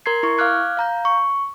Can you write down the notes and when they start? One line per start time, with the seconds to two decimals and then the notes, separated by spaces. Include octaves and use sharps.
0.06 A#4 A#5 C6 G#6 C7
0.23 E4 C#6
0.38 F5 D6 F6 F#6 G#6
0.77 F5 A#5 G6
1.05 C#6